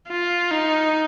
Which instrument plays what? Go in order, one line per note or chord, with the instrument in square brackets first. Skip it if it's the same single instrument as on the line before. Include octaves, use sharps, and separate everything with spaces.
[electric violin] F4
D#4